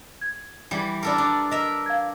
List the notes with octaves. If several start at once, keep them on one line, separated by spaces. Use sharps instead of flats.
G#6
E3 G3
D4 A4 A#4 D5 B5
D4
A#4 D#5 E5
F5 G#6